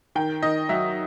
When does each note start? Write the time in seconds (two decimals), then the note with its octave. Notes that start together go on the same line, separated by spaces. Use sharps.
0.15 D#3 G5
0.43 D#3 D#5
0.69 F#3 E5